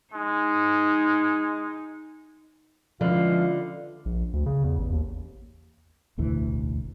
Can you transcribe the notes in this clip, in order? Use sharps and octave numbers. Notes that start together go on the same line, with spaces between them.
G#3 D#4
D3 E3 F3 G#3 C#4 F4 F5
A#1
D2
C#3
E2
A1
D#2
E1 A1 D2 E3